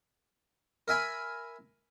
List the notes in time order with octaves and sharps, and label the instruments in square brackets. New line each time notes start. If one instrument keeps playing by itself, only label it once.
[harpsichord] A#4 E5 G#5 B5